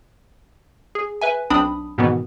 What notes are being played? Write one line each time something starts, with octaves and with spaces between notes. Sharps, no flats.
G#4
B4 E5 G#5
B1 C4 D4 B5 D#6
G#2 B2 D#3 E3 B3